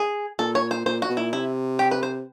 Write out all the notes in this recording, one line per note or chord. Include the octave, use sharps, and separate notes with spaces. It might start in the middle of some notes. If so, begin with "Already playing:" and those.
Already playing: G#4
A#2 A4
C#5
C5
A#2 C5
F#4
B2
A#2 E4
C3 E4
G4
B4
C5